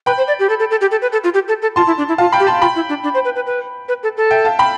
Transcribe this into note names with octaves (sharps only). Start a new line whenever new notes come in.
B4 G5 B5
C5
D5
G4
A4
A4
A4
G4
A4
B4
A4
F4
G4
A4
A4
F4 A5 C6
E4
D4
E4
F4 F5 A5
G5 B5
G4
A5 C6
F4 G5 B5
E4
D4
D4
C5
B4
B4
B4
B4
A4
A4
E5 G5
F5 A5
G5 B5